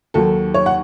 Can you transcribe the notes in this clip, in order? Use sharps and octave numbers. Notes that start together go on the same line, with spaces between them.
D#2 D#3 F#3 A4
C#5
F#5